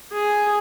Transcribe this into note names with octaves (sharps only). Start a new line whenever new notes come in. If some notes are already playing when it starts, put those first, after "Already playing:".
G#4